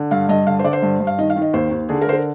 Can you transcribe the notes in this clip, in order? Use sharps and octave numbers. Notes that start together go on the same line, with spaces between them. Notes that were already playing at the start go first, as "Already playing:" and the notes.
Already playing: D3
G2 F5
G2 D#5
D3 F5
C5
D3 D5
C5
G2
G2
F5
D#3 D#5
F5
D#3
D#5
D#2 C5
D#2
D3 G#4
A#4
D3 C5
A#4